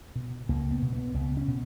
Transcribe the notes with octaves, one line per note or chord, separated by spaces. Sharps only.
B2
C#2 A#3
B3
B2
B3
C#2 B3
C#4
B2